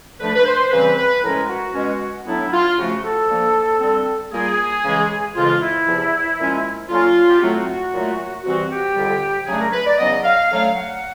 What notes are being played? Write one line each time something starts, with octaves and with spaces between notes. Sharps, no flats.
D3 F3 A3 D4 B4
B4
C5
C#3 E3 G3 C4 B4
B4
A2 F3 G#3 C#4 A#4
F#4
B2 G#3 C#4
A2 F#3 B3 D4 E4
F4
C#3 F3 A3 F#4
A4
D3 F3 A#3
D3 G3 C4
A#2 G3 A#3 G#4
C#3 E3 G#3
F2 C#3 E3 G#3 F4
E4
E2 C3 F3
A#2 F3 G#3 C#4
D3 F#3 A#3 C#4 F4
G4
A2 F#3 A3 C4 F#4
A#2 F#3 A3
C3 E3 G3 C4 F#4
G4
F2 D3 G3
C#3 F#3 A3 D4 G#4
A#4
B4
D5
E2 C#3 F#3 B3 D#5
F5
D3 F#3 A3 C#4 F5
F#5